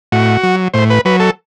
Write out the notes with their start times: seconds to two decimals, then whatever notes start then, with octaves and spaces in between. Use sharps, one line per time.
0.12 A2 F#4
0.43 F#3
0.74 A2 C5
0.90 B4
1.05 F#3 B4
1.20 A4